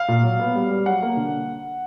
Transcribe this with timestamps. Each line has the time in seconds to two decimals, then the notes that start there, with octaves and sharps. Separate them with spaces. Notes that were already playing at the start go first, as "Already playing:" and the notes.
Already playing: F5
0.08 A#2
0.23 F#3
0.39 B3
0.56 G3
0.71 G3
0.86 F#3 F#5
1.02 A#3
1.17 D3